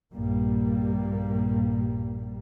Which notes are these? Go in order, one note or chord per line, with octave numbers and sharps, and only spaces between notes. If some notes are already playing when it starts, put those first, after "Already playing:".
A#1 G2 G3 A#3